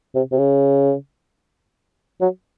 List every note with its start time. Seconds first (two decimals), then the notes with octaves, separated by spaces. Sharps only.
0.15 C3
0.32 C3
0.38 C#3
2.21 F#3